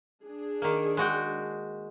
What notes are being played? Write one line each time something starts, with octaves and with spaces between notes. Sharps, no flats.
D4 G#4
D#3 A#3
G#3 F#4 G5